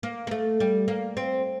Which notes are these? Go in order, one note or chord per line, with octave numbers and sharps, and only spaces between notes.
A#3
A#3
A3
G3
A#3
C4